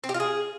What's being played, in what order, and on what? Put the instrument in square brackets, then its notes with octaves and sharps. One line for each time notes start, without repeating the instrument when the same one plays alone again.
[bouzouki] C4
G4
F4
G#4